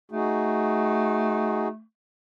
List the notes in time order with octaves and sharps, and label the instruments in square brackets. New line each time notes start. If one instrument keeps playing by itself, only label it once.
[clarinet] A3 [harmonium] D#4 F#4 G#4